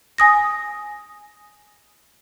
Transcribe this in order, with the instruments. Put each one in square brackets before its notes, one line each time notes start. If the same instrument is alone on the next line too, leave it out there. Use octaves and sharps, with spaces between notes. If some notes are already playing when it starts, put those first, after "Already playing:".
[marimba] G#5 D#6 A#6